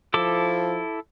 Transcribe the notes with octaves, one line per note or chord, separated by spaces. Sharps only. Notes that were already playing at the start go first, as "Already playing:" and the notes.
F3 E4 A4 D6